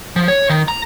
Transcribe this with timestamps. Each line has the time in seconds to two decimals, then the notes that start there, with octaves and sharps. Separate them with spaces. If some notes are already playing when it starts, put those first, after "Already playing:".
0.16 F3
0.28 C#5
0.50 D#3
0.68 A#5